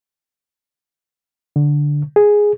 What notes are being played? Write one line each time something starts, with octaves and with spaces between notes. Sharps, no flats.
D3
G#4